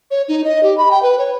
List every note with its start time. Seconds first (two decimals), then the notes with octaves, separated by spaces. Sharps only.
0.11 C#5
0.28 D#4
0.44 D#5
0.63 G4
0.77 B5
0.91 G5
1.03 B4
1.19 C#5